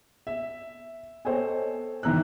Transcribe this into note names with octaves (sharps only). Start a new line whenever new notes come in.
E5
A4 C5 C#5 D#5 G5 G#5
G1 D#3 E3 A#5 E6 F#6